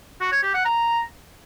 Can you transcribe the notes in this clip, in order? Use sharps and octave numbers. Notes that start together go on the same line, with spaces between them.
F#4
C#5
G4
F#5
A#5